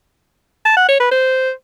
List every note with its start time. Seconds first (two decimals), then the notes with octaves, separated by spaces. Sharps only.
0.65 A5
0.77 F#5
0.88 C#5
1.00 B4
1.11 C5